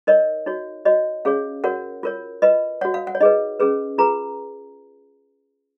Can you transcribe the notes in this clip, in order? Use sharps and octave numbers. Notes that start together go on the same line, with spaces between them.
D#4 A#4 C#5 D#5
D#4 F#4 C#5
F#4 C#5 D#5
C#4 G#4 C#5 F5
F#4 A#4 C#5 F#5
F4 A#4 C#5
F4 B4 D#5
F#4 C#5 F#5
F5
F#5
C#5
D#4 G#4 B4 D#5
C#4 G#4 B4
F4 G#4 B4 A#5